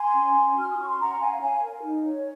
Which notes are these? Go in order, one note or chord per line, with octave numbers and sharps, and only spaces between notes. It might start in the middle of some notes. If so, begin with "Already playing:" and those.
Already playing: G#5 C6
C#4
C#4
F#4 F6
D#6
C#4 C#6
C6
C#4 F#5 A#5
C#4 F5 G#5
C#5 F5 G#5
A#4
D#4
C#5